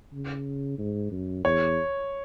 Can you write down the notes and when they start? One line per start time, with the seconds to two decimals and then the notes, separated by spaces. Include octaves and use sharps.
0.13 C#3
0.78 G#2
1.11 F#2
1.44 E2 C#5